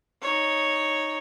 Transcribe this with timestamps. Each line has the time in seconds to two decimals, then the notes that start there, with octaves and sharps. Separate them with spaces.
0.21 D#4 C#5